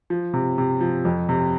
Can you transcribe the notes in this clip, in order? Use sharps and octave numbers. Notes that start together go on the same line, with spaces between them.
F3
C3
C3
F3
F2
C3